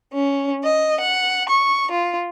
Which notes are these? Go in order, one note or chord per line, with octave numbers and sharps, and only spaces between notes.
C#4
D#5
F#5
C#6
F4